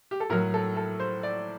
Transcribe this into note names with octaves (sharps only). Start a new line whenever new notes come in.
G4
A4
A2 F#3 A#4
A4
A4
C5
D5